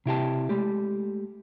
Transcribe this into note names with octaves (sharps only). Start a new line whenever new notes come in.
C3 E4 G4 A5
G#3 A3 G4